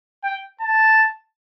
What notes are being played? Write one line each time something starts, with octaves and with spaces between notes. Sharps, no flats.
G5
A5